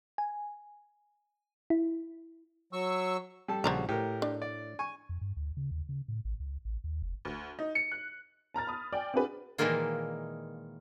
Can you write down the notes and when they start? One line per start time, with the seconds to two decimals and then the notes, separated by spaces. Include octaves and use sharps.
0.18 G#5
1.70 E4
2.73 F#3 C#6 E6
3.48 G3 A4 A5
3.64 A#1 C#3 F#4 C5 D5 A#5
3.89 A2 G4 A#4
4.22 D4
4.42 D5
4.79 G#5 C#6
5.09 F2
5.21 G2
5.37 D2
5.57 C#3
5.71 D#2
5.89 C#3
6.08 A2
6.25 A1
6.40 C#2
6.65 A1
6.84 D#2
7.02 F1
7.25 D2
7.59 D#4
7.75 C#7
7.92 F#6
8.54 A5 A#5 F6 A6
8.67 B5 D#6
8.93 D5 G5 G#5
9.14 C4 D4 F#4 G#4 B4
9.58 A#2 D#3 E3 G#3 A#3 F4